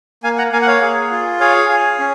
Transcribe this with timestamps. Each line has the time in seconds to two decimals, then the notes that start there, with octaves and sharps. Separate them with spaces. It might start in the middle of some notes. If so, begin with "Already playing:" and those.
0.23 A#3 F5 G#5
0.38 F#5 A#5
0.52 A#3 F5 G#5
0.62 F#5
0.67 C#5 F5
0.82 G#4
1.11 F4
1.40 G#4 C#5 F5
1.69 G#4
1.99 C#4